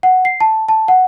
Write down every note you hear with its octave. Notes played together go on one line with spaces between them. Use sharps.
F#5
C7
A5
A5
F#5